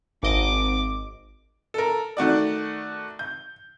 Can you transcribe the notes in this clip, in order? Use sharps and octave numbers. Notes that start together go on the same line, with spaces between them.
G#1 D#5 D6 D7
A4 A#4
D#3 A3 F#4 D5
G6